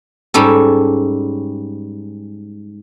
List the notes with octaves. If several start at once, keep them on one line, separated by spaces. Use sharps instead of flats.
G#2 G3 C#4 A4